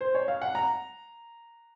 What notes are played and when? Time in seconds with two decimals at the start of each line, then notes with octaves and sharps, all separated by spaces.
0.01 C5
0.15 C#5
0.28 F5
0.42 F#5
0.55 A#5